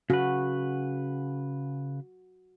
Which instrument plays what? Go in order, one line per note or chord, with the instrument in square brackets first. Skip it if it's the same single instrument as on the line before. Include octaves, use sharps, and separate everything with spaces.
[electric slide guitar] C#3 B4 [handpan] F#4